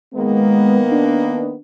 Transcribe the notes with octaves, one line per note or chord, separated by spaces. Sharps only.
D#3 G#3 A#3 B3
D4